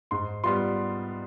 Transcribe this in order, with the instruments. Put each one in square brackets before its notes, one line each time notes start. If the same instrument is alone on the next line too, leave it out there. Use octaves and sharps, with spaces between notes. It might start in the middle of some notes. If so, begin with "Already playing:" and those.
[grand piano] G#2 C6
G3 B3 F4 C6